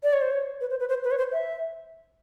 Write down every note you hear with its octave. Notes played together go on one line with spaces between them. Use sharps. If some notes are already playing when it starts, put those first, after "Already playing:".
D5
C#5
C5
C#5
B4
C5
B4
C5
B4
C#5
C5
E5